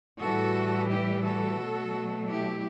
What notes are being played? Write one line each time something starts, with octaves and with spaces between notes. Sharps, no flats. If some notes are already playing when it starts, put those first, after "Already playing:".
A2 E3 G3 F#4 A4
E4 G4
F#4 A4
B2 F#3 A3
E4 G4